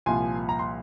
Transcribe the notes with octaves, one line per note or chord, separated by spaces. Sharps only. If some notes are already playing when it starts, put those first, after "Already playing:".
C2 A#2 F3 G#5 C6
A#5
C6